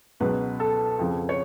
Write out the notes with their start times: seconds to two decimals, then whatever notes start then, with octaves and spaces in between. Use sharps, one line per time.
0.20 C#2 B2 F#3 B4
0.60 A4
0.99 F2 C#3 F3
1.29 C#5